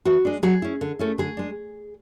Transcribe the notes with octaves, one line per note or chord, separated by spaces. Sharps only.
E3 F#4
G#3 D4
F#3 G#4
C#4 E4
D3
A3 C#4 E4
D3 G#4
G#3 D4